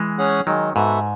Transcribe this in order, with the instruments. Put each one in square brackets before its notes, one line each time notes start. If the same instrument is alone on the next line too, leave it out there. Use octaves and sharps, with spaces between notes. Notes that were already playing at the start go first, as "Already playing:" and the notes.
Already playing: [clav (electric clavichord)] E3 G#3
[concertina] C#4 G#4 C#5 F#5
[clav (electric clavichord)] D#3 F#3 [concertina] G#3
[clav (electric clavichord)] G#2 [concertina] B3 F#4 A4 E5